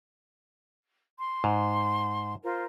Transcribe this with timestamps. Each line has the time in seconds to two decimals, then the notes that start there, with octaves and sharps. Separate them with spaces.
1.17 C6
1.44 G#2
2.43 F4 A#4 C5